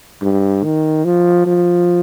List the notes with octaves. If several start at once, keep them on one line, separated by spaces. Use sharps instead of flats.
G2
D#3
F3
F3